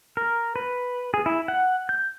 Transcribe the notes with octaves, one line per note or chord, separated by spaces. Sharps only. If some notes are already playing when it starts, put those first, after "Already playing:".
A#4
B4
G#4
E4
F#5
G6